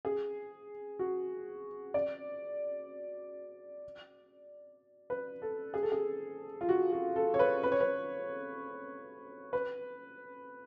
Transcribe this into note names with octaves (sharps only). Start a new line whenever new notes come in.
G#4
F#4
D5
B4
A4
G#4
A4
G#4
F4
F#4
F#4
A4
C#5
B4
B4
C#5
B4
B4